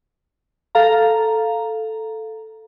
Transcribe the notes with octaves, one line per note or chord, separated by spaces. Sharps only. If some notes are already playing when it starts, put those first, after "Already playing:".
A4 F5 A#5